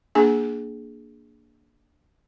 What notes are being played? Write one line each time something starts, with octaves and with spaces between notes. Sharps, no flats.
A#3 D4 G#4 G#5